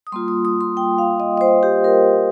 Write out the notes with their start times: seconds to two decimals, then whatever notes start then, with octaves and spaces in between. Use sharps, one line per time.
0.07 D#6
0.12 G3 A#3 F4 C6
0.28 D#6
0.45 D#6
0.61 C6
0.77 G5
0.98 F5
1.20 D#5
1.37 D#5
1.41 C5
1.63 G4
1.84 A#4